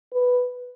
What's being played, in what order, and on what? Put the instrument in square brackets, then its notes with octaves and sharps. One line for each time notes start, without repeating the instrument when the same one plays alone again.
[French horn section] B4